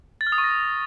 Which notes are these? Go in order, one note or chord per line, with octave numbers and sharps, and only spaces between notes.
A6
F6
D#6
C#6
A#6